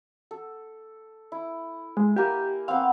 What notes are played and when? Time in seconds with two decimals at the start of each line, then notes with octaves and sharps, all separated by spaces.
0.31 A4
1.32 E4
1.97 G#3
2.16 A#3 G4 G#5
2.68 B3 C4 F5